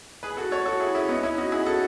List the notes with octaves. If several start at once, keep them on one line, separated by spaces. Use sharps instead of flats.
G#4 B4
F#4 A4
A4 C#5
F#4 A4
E4 G#4
C#4 E4
B3 D#4
C#4 E4
D#4 F#4
E4 G#4
F#4 A4